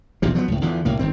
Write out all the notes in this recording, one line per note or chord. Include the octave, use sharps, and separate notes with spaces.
A#1 E2 C3 F3
F3 F#3 G#3 B3
C#2 A2
E2 D3 E3 F3
C2 A2 A#3
G1 D#3 C4